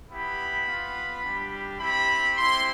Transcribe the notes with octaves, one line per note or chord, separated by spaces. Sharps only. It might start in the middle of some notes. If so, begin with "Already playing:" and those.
B3 E4 G4 B5
B3 F4
G3 D4 G4
C4 E4 G4 B5
C4 E4 G4 C6